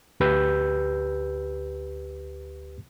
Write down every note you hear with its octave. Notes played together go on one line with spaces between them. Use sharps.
D2 G4 B4 E6 G6